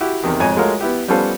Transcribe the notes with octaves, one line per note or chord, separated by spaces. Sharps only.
E4 F#4 G4
E2 C3 D#3
F2 G#2 C#5 G#5
G#3 A3 F4 F#4 A#4 C#5
B3 E4 G4
G3 B3 C#4 F4 A4 C5